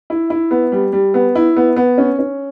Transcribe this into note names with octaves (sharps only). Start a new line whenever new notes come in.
E4
E4
B3
G3
G3
B3
E4
B3
B3
C#4
C#4